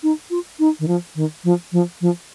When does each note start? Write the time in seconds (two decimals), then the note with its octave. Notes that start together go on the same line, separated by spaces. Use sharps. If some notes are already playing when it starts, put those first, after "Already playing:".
0.03 D#4
0.30 F4
0.59 D#4
0.79 D#3
0.88 F3
1.15 D#3
1.44 F3
1.72 F3
2.01 F3